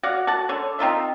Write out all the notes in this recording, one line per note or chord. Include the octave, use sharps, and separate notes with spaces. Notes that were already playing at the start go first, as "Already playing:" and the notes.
F#4 D5 F5 F#5
F#4 F#5 A5
D3 C#5
C4 D#4 F4 E5